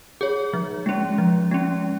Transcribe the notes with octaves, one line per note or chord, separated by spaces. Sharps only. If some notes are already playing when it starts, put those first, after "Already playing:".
G#4 C#5
F3
G#3 C#4
F3
G#3 C#4